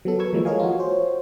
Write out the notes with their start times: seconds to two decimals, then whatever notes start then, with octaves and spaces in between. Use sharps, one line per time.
0.05 F#3 B3 A4
0.19 A#4 B4 C#6 E6 G#6
0.33 E3 F3 G#3 A#3
0.45 A4 A#4 C#5 D#5 F5 G#5
0.59 F4 F#4
0.79 C5 C#5